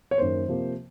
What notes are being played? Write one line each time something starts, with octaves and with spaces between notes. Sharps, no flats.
C#5
F#2 D#3 A#3 C5
C3 F3 A#3